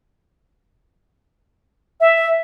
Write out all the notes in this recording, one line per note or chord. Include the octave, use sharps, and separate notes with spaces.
E5